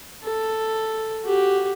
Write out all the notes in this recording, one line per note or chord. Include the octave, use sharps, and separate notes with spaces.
A4
F#4 G4